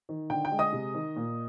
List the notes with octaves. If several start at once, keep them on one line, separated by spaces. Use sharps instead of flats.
D#3
D3 G5
G5
G#3
D#5 D#6
C3
D#3
A#2